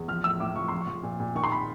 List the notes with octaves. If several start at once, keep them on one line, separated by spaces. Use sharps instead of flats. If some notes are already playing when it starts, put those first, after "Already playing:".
Already playing: E2
F3 F6
A2 E6
A2 D6
F3 C#6
F3 C6
C#6
F3
A#2
A#2
D#3 C#6
C6
B5